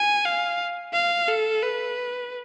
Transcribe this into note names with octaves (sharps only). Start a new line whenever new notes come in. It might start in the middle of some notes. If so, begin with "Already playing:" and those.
Already playing: G#5
F5
F5
A4
B4